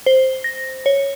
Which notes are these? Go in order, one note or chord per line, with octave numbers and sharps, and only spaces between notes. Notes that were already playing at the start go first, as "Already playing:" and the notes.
C5
A#6
C#5